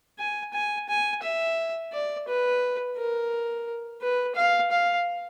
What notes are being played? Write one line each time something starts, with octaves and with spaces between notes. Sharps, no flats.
G#5
G#5
G#5
E5
D5
B4
A#4
B4
F5
F5